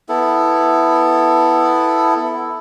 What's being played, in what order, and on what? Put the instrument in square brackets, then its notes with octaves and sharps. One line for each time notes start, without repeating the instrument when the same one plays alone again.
[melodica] B3 E4 A4